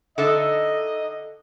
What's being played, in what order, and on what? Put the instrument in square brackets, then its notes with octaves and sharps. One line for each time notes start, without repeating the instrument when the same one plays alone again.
[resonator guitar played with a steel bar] D3 A4 E5 [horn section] D#4 D#5